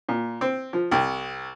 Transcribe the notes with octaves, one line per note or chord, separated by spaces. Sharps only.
A#2
C4
F3
C2